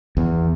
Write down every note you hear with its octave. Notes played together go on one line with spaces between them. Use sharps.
E2